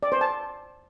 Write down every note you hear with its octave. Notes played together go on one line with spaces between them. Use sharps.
D5
C5
A5